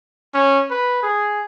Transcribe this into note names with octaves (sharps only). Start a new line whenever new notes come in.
C#4
B4
G#4